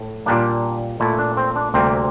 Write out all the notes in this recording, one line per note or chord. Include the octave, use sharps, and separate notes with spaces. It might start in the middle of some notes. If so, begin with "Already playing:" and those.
Already playing: A2
A#2 G3 A#3 D4
A#2 A3 E4
D4
C4
D4
D2 C3 G3 A#3 C4